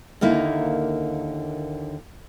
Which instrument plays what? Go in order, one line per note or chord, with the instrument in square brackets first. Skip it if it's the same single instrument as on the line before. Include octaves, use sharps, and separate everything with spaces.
[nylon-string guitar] D#2 D3 A#3 D#4 E4